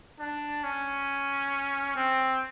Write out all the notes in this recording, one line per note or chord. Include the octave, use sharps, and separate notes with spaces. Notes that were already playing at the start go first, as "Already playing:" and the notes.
D4
C#4
C4